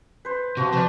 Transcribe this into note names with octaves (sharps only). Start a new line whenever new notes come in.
B4 C5
C3 F3 F#4
F3 B4 D5